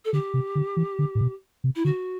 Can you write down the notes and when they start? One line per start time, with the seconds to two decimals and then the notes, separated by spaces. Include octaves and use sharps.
0.05 A4
0.13 D3 G4
0.34 C3
0.55 D3
0.77 E3
0.99 D3
1.15 A2
1.21 B2
1.64 C3
1.75 E4
1.85 D3 F#4